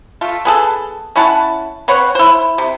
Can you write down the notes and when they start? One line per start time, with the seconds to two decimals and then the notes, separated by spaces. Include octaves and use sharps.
0.21 A3 F4
0.45 B3 G#4 A4
1.16 C#4 E4 F#5 A5
1.88 C4 B4 C#5 F#5
2.15 E4 C5
2.58 C3